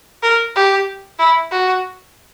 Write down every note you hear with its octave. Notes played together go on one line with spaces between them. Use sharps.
A#4
G4
E4
F#4